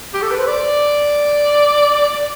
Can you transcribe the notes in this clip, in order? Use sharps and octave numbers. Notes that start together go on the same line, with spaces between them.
G4
A4
B4
C5
D5